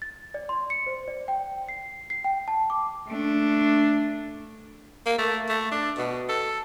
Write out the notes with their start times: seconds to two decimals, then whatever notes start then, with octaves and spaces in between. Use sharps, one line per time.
0.02 A6
0.34 D5
0.49 C6
0.70 C#7
0.87 C5
1.08 D5
1.28 G5
1.69 C7
2.10 C7
2.24 G5
2.48 A5
2.70 D6
3.08 A3 D4
5.06 A#3
5.19 A3
5.49 A3
5.72 D4
5.98 B2
6.29 A4